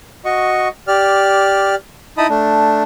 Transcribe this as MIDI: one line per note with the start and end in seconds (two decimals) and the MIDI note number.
0.25 0.68 66
0.25 0.68 75
0.25 0.68 85
0.88 1.75 67
0.88 1.75 74
0.88 1.75 89
2.18 2.27 63
2.18 2.27 64
2.18 2.27 75
2.18 2.27 81
2.18 2.27 83
2.18 2.27 87
2.29 2.83 57
2.29 2.83 62